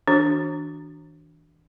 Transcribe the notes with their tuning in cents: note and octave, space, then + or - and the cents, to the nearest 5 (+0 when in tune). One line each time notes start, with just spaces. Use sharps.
E3 -45 D4 +0 F#4 +0